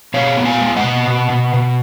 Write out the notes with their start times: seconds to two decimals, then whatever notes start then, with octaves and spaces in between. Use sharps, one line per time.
0.14 B2 C#5 F5
0.37 B3
0.45 F5 G#5
0.61 G#3
0.76 D#5 F#5
0.84 B2
1.07 B2
1.30 B2
1.54 B2